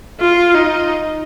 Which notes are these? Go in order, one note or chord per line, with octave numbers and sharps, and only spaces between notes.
F4
D#4